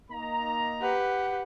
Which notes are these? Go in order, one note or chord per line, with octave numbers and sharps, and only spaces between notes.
A#3 D#4 A#5
G4 B4 F#5